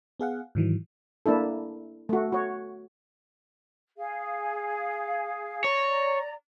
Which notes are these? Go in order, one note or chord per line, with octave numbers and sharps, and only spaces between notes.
B3 G#4 F5 F#5
G#2 D#3 E3 F#3
A#3 D4 E4 A4
A3 F#4
F#4 C#5
G#4 F5
C#5 D5 A#5